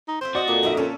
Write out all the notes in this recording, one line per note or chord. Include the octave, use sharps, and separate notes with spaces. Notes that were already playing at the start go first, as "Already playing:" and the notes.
D#4
C4 F4 C5 E5
F#4 D5 D#5
A#2 A4 A#4
F2 A#3 D#4 D5 E5
A#2 C#4 A4 E5